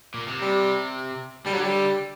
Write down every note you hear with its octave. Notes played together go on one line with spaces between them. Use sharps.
A#2
C3
G3
D3 G3
F#3
G3